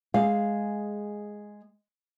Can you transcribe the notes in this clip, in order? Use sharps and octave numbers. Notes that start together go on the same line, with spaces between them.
G#3 G#4 F5